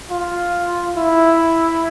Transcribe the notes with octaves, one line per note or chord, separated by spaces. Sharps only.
F4
E4